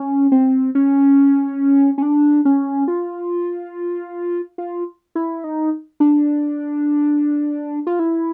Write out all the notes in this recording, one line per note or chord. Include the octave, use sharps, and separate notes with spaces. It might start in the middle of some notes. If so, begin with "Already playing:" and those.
Already playing: C#4
C4
C#4
C#4
D4
C#4
F4
F4
E4
D#4
D4
F4
E4